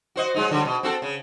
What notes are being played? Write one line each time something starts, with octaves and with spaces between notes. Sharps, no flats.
F#4 C5 D#5
F#3 G#3 D#4
D3 F#3 G3
B2
C4 F#4 A4
C#3